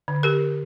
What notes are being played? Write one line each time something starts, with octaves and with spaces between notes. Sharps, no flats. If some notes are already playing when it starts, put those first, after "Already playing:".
D3
G4 A#4